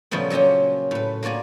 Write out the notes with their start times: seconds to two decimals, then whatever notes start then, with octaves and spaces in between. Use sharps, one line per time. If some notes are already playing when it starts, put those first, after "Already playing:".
0.11 A#2 C#3 F3 G3 A3 B3
0.30 F#3 A#3 C#4 F4 G4
0.91 A2 B4
1.23 A#3 F4 F#4 D5 G#5